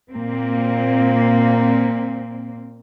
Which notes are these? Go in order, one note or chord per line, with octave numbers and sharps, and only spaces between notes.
A#2 A#3 C4